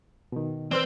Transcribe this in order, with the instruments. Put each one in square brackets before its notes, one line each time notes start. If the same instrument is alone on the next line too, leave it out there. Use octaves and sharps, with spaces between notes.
[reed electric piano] B2 D#3
[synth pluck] E3 C6 E6 [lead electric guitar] C4 [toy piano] B4 C5 D5